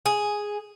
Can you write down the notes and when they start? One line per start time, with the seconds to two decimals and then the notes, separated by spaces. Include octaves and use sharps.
0.06 G#4